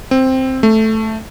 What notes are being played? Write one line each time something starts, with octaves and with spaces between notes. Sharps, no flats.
C4
A3